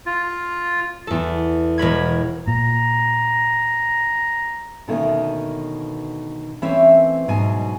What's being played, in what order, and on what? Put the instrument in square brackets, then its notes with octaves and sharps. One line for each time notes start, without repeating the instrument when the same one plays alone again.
[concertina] F4
[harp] E2 A4
E1 A#4 B5 G#6
[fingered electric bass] A#2 [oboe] A#5
[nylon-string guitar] B2 D3 D#3 A3 A#3 C#4
E3 A3 C4 C#4 C#5 E5
G#2 B2 F#3 D4 G#5